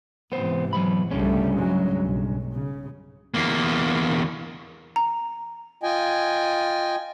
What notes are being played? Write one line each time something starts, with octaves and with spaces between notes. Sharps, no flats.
G#2 C3 E3 B3 C5
F#3 B3 B5
C2 G2 C#3 G3 A3 C#4
F#3 G#3
B1
C#3
E2 A#3
A#5
F4 D#5 G5 G#5